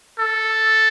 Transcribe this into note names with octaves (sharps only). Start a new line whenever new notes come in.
A4